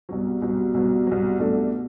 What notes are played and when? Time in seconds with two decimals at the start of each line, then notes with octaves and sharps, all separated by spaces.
0.09 C2 B2 F#3
0.42 C2 B2 F#3
0.74 C2 B2 F#3
1.07 C2 B2 F#3
1.39 C2 B2 A3 D4 A4
1.73 B2